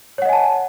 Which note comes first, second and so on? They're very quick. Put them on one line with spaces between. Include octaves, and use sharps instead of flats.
C#5 F#5 D#5 G#5 A5